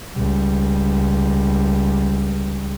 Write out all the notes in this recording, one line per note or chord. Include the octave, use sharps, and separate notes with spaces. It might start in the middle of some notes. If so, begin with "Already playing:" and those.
C#2 G3